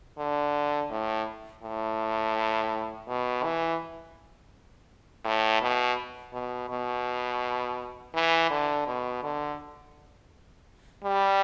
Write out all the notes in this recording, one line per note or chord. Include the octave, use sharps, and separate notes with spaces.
D3
A2
A2
B2
E3
A2
B2
B2
B2
E3
D3
B2
D3
G3